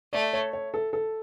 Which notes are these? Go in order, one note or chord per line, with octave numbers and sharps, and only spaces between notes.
A3 D5
C#5
C#5
A4
A4